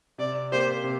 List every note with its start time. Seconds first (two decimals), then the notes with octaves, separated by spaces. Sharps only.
0.18 C3 D5
0.52 A#3 G4 C5
0.84 C3